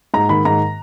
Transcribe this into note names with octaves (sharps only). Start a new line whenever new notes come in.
G#2 A#5
D#3 B5
G#2 A#5